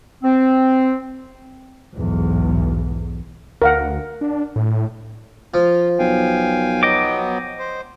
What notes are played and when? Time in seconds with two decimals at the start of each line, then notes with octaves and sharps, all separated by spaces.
0.23 C4
1.94 B1 E2 G#2
3.62 D2 A#4 F5 F#5
4.21 D4
4.56 A2
5.54 F3 F4
5.99 B1 F5 G5 G#5
6.83 F#3 B3 D#5 G5 D6
7.59 C5